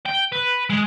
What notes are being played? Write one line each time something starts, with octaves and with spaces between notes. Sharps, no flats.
G5
B4
G#3